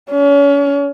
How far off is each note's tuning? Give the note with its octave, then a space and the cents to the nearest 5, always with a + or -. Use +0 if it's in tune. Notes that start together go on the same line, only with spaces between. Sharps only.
C#4 +35